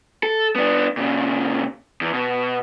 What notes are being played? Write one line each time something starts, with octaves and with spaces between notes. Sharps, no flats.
A4
B3 D4
A#2 C#3
E2
B2